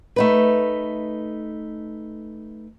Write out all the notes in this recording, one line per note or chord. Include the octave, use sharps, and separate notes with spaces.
A3 D#4 B4